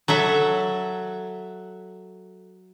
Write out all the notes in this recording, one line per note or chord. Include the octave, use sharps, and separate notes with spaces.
F#3 A4 E5